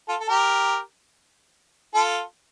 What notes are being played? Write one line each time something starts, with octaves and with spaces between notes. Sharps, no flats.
F4 A4
A4
G4 A#4
F4 A4